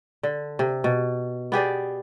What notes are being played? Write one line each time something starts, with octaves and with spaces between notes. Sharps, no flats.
D3
C3
B2
B3 G4 G#4 D5